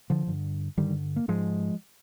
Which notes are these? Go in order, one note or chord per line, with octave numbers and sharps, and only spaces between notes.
D3 F3
G2 D3
G2 D3 D#3 G3
A#3
G#2 F3 G#3